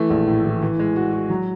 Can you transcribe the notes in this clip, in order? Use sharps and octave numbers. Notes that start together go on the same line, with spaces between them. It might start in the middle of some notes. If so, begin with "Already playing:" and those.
Already playing: E3 A3
A#1
A2
E3
E3
G#3
F#4
F#4
F#3